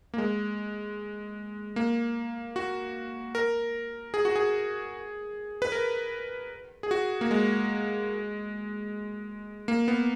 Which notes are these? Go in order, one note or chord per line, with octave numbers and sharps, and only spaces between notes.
A#3
G#3
A#3
F#4
A#4
G#4
F#4
G#4
B4
A#4
G#4
F#4
A#3
G#3
A#3
B3